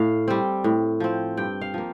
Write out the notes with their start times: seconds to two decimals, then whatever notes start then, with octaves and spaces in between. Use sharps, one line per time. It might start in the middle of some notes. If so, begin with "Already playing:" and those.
Already playing: A2 F5
0.28 G3 C4
0.64 A2
1.00 F3 C4
1.37 G2 G5
1.61 F5
1.74 F3 A#3